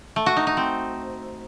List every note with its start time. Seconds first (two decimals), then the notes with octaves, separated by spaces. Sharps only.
0.16 A3
0.26 F#4
0.37 D#4
0.47 D#4
0.57 C4